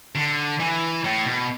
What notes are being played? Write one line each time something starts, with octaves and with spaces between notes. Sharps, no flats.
D3
E3
A2
B2